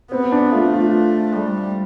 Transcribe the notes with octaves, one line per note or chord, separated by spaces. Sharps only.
B3 C4
D4
A3 F4
F4
G3